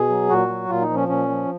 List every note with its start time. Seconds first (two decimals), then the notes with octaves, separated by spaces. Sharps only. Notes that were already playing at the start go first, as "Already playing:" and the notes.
Already playing: B2 G#4
0.09 F#3
0.29 A#2 F#4
0.49 F#3
0.69 A#2 F4
0.82 D#4
0.89 F3
0.96 C#4
1.09 A#2 C#4
1.29 F3